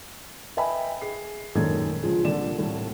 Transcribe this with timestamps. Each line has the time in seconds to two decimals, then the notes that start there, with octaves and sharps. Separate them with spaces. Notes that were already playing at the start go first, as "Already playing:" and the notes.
0.57 B4 D#5 E5 G5 G#5 B5
1.01 G#4 C7
1.55 A#1 F#2 D#3 G#3 A4 G#6
2.03 C#2 D3 F3 G#4
2.24 C2 A#2 D3 A4 D5 E7
2.58 C2 A2 A3